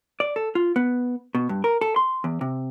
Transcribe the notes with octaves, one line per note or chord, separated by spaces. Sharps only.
D5
A4
F4
B3
B2
G2
A#4
A4
C6
E2
C3